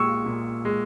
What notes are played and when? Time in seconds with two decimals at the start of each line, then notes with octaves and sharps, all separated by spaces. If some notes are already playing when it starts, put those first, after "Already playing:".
Already playing: A#2 G#3 C#6 E6
0.26 A#2
0.65 G#3